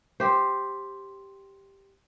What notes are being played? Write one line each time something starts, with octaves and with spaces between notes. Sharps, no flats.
G4 C5